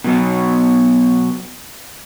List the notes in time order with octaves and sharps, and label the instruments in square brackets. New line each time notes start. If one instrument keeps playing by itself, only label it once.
[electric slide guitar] B2 F#3 B3